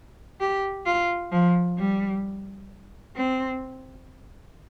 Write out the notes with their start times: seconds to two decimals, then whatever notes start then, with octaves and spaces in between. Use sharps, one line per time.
0.40 G4
0.86 F4
1.32 F3
1.78 G3
3.16 C4